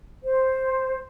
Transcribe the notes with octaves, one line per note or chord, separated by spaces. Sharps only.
C5